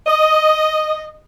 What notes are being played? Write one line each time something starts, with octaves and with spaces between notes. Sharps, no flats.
D#5